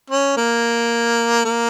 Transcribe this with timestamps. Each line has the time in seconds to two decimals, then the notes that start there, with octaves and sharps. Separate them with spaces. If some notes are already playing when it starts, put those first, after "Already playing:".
0.10 C#4
0.37 A#3
1.45 A#3